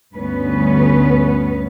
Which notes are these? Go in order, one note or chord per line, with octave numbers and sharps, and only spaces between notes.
D2 G2 B3 C#4 B4